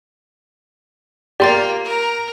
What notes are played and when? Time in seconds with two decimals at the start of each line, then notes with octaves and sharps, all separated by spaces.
1.40 A#3 F4 G4 D5 C6 A6
1.84 A#4 A#5